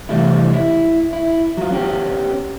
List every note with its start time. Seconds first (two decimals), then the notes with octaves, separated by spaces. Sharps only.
0.09 C3 E3 G3 A3 E4
0.53 E4
1.13 E4
1.57 F#3 F4
1.71 B3 C#4 G4